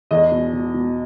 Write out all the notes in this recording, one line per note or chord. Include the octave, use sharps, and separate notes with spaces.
E2 D#5
B2
B2
B2